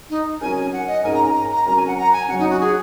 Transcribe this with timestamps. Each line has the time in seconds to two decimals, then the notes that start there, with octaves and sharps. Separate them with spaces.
0.10 D#4
0.41 F#3 C#4 A#4 G#5
0.56 G#5
0.73 F#5
0.87 D#5
1.04 G#2 G#3 C#4 A#4 G#5
1.14 A#5
1.24 A#5
1.35 A#5
1.51 A#5
1.66 F#3 C#4 A#4 A#5
1.77 G#5
1.87 F#5
1.97 A#5
2.13 G#5
2.28 F#2 F#3 C#4 F#5
2.39 D#4
2.50 F#4
2.61 G#4